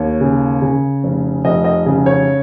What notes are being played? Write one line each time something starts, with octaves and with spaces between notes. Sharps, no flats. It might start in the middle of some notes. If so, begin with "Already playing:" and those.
Already playing: D#2 C#5
C#3
C#3
F1
F1 D#5
D#5
C#3
C#5